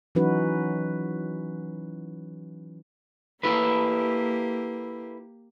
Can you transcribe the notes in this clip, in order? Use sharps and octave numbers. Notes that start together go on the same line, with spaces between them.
E3 F#3 C#4 D#4 F#4 B4
A#3 E4 G4 A4 B4